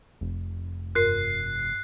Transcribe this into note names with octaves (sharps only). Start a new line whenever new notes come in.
F1
G2 A#4 C6 F#6 C7